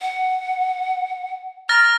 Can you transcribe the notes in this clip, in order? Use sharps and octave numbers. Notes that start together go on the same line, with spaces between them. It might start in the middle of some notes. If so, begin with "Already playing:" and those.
F#5
A#5 F6 A6 A#6